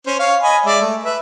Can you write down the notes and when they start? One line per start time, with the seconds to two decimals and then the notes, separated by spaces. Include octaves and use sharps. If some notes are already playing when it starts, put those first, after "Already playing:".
0.06 C#4 C5
0.19 C#5 F5
0.43 D#5 G#5 B5
0.65 G#3 D5 E5
0.81 A3
1.04 B4 E5